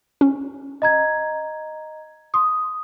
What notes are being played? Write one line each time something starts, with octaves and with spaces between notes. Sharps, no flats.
C#4
D#5 A#5 G#6
C6 D#6